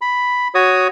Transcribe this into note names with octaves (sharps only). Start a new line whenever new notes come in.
B5
F#4 C#5 D#6